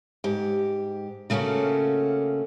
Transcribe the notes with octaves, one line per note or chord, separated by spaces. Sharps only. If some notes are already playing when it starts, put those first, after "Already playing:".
G#2 G4
C#3 A3 A#3 C#4 F#4